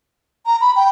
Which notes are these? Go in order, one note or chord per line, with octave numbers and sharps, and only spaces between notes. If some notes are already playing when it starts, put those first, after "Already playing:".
A#5
B5
G5